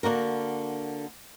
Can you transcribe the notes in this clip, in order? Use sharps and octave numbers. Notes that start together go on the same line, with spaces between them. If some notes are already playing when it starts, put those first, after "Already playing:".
D3 A#3 F#4 A#4